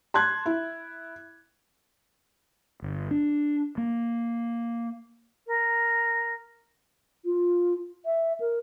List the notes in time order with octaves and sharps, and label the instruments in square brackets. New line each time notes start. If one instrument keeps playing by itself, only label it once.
[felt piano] A5 C6 F#6 G#6
E4
[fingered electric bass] G1
D4
A#3
[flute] A#4
[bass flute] F4
E5
A#4